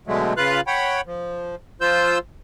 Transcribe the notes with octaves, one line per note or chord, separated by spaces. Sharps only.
B2 D3 F#3 G#3 A3
C#3 F4 B4 F5 F#6
C#5 F#5 G5 B5
F3
F3 F4 C5 E6 G6